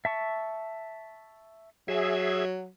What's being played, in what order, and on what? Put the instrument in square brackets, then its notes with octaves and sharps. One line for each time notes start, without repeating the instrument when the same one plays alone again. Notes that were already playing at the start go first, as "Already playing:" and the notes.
[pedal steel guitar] E5 A5 C#6
[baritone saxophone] F#3 [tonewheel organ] G#4 E5